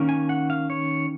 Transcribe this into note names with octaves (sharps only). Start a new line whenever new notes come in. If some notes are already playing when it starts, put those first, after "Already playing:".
Already playing: D#3 A#3 C#4
G#5
F#5
F5
C#5